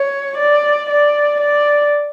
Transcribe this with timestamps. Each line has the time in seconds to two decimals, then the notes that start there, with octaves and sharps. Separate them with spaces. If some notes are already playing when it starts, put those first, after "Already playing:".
Already playing: C#5
0.38 D5
0.89 D5
1.40 D5